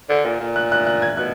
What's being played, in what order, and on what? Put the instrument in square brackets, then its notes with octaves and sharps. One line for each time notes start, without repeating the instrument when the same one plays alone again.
[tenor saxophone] D3
A#2
A#2
[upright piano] F#6
F#6
F#6
G#6
[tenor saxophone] B2 [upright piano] F#6